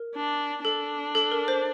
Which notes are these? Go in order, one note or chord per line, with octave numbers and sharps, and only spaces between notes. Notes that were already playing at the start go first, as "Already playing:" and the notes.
Already playing: A#4
D4
D4 A4
A4
A#4
C5